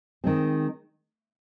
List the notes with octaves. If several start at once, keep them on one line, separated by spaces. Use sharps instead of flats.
D#3 G#3 C4